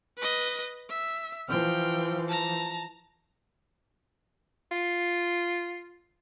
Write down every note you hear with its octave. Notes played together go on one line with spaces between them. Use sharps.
B4 D#5
E5
E3 F3 G5 F6
A5 A#5
F4